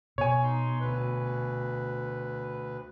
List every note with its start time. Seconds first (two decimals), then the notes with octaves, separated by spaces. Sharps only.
0.18 B2 C#5 G#5
0.43 D#4 C6
0.80 D2 B4